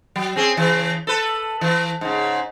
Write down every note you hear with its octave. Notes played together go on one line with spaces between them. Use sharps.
F#3
C4 C#4 G#4
C#3 E3
A4 B4
E3
G#2 C#3